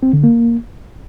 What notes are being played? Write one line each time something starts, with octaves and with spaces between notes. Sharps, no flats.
C4
D3
A#3